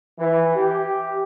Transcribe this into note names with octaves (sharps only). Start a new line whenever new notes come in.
E3
G4